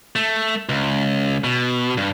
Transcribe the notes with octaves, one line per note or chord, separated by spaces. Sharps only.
A3
C#2
B2
G2